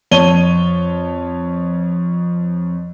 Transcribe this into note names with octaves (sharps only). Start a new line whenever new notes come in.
F2 C#5 A5 D#7 G7